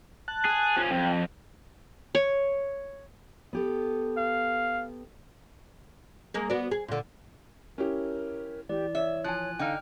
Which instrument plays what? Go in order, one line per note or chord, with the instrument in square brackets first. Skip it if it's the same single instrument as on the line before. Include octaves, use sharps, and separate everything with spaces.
[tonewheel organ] A5 F#6
[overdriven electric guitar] G#4
F3 C#4
[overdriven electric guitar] F2 [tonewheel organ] G5
[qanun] C#5
[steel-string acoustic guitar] B3 G4 A4
[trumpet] F5
[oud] G#3 A#3
B3 F#4 D5
G#4
A#2 D3
[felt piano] C#4 E4 G4 [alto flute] A#4
[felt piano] E3 [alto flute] G4 [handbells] D5
[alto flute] C#5 [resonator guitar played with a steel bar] E5
[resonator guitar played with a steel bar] F3 [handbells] G#5 F#6
[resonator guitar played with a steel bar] D3 D#4 [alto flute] F5 [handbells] G5 F6